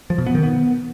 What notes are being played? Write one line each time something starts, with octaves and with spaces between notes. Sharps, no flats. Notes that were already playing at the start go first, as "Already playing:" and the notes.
F3
B2
B3
D#3
B3